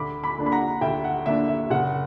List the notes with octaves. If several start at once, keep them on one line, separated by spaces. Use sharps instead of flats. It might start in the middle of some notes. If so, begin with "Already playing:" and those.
Already playing: D2 B5 D6
B5 D6
D3 A#3 D4
B5
F#5 A#5
D2 E5 G5
F#5
D3 A#3 D4 E5
E5
F#1 F#5